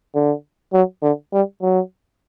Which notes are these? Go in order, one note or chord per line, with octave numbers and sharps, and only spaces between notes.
D3
F#3
D3
G3
F#3